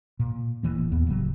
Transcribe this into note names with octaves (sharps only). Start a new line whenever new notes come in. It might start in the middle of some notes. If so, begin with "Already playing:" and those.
A#2
D1 D#2 E3 A#3
D#2 B3
D1 C#3 F#3